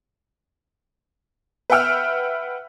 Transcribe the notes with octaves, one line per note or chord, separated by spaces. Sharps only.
B4 E5 F#5 G5 E6 F6